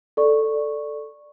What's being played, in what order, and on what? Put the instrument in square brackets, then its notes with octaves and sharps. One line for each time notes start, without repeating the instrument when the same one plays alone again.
[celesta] A4 D5 C#6